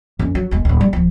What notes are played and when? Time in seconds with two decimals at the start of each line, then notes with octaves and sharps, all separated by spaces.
0.19 F2 C#4
0.35 F#3
0.51 D#1 G#3
0.65 D1 C#4
0.81 G3
0.93 D1 F3